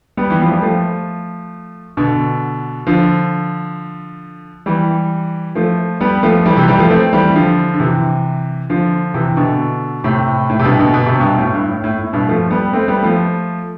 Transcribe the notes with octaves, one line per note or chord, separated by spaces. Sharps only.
G3 B3
E3
F3
G3
F3 A3
B2 D3
D3 F3
E3 G3
F3 A3
G3 B3
F3 A3
E3 G3
C3 E3
E3 G3
F3 A3
A3 C4
E3 G3
D3 F3
D3
C3 E3
D3 F3
C3 E3
B2 D3
A2 C3
A2
C3
G2 B2
B2 D3
B2
C3
G2 B2
A2
G2
A2
A2
A2
G2 B2
F3 A3
G3 B3
A3 C4
G3 B3
F3 A3